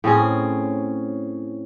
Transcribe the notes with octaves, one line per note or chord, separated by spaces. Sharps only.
A2 C4 C#4 G#4